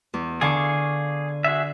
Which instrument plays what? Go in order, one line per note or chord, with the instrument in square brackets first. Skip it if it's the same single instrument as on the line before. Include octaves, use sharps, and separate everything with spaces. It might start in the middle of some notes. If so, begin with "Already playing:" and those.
[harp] E2
[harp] D3 D6 [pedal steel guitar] G#4 F5 C#6
[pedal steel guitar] F#4 G#4 E5